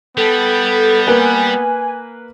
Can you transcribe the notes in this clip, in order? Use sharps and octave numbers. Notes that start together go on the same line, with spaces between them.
G3 B3 A4
A#3 B4 G#5